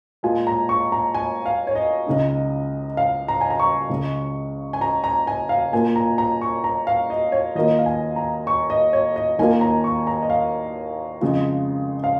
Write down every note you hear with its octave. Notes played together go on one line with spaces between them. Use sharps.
A#2 G#3 F4 G#5
A#5
C#6
A#5
G#5
F5
C#5
D#5
C#2 C#3 G#3 D#4
F5
A#5
G#5
A#5
C#6
C#2 C#3 G#3
G#5
A#5
A#5
G#5
F5
A#2 A#3 F4 G#5
A#5
A#5
C#6
A#5
F5
D#5
C#5
D#2 D#3 A#3 F4 D#5
F5
G#5
A#5
C#6
D#5
C#5
D#5
D#2 D#3 A#3 F4 G#5
A#5
C#6
A#5
D#5
F5
F2 C#3 G#3 F4
F5